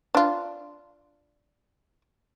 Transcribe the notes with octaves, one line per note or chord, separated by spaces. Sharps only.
D4 F4